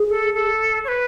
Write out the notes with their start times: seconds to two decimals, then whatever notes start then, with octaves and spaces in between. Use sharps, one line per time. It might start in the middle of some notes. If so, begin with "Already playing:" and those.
Already playing: G#4
0.09 A4
0.34 A4
0.84 C#5
0.88 B4